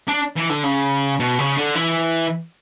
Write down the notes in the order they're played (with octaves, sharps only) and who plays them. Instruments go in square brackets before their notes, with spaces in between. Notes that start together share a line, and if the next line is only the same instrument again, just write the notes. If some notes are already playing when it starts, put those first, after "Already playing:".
[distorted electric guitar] D4
E3
D3
C#3
B2
C#3
D3
E3